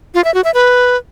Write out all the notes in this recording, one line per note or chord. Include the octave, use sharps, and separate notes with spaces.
F4
E5
F#4
E5
B4